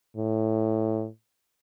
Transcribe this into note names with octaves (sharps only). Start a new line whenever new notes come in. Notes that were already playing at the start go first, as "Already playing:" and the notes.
A2